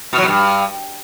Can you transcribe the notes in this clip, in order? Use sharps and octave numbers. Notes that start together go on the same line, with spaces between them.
B2
F#3
B2
G2